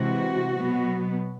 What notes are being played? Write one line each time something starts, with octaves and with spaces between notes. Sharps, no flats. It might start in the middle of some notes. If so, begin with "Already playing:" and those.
Already playing: C3 E3 G#3 C4 F#4
B2 F#3 B3